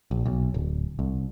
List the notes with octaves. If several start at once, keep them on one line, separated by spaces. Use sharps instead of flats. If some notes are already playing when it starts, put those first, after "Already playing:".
A#1
B1
D1
C2